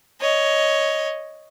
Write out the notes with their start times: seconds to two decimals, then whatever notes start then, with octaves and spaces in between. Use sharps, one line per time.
0.21 C#5 D#5